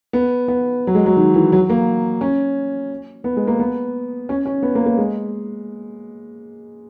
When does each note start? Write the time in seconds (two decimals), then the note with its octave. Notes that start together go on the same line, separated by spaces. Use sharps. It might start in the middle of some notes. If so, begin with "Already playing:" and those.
0.13 B3
0.48 B3
0.87 F#3
0.95 G#3
1.06 F#3
1.17 D#3
1.34 E3
1.52 F#3
1.70 A#3
2.21 C#4
3.24 B3
3.37 G#3
3.47 A#3
3.59 B3
4.29 C#4
4.46 C#4
4.63 B3
4.75 A#3
4.86 A#3
4.98 G#3